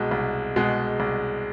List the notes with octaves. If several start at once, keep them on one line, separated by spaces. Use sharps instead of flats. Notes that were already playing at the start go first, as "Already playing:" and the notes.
Already playing: C2 B2 G#3
C2
B2 G#3
C2